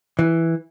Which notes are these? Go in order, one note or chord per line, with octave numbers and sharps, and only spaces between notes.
E3